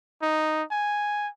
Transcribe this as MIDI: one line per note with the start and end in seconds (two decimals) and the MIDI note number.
0.22 0.63 63
0.71 1.29 80